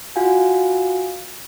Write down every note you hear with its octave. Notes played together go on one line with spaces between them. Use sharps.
F4 F#4 F5 F#5 G#5